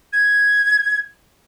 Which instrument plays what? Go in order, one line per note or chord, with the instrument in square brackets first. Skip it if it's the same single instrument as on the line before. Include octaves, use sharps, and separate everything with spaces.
[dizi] G#6